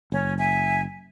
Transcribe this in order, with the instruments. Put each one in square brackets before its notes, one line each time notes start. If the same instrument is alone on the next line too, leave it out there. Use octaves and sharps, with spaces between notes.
[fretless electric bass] F#1 [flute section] C#4
[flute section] E5 G#5